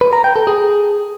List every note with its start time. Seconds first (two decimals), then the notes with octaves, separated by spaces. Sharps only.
0.01 B4
0.13 A#5
0.24 G5
0.36 A4
0.47 G#4